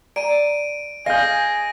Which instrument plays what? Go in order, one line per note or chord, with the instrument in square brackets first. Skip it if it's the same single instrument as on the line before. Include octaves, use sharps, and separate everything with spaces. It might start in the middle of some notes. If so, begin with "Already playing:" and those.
[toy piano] D5 G#5 A#5 [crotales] D7 D#7
[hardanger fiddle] G#4 [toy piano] D#5 [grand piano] F5 G6 [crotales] A#6